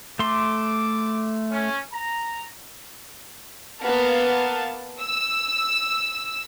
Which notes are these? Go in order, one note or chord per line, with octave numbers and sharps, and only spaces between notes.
A3 C6 D6
C#4
A#5
A#3 B3 F5 A5
E6